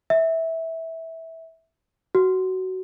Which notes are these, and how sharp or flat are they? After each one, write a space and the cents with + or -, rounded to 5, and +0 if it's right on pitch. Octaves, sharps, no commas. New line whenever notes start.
E5 -15
F#4 +15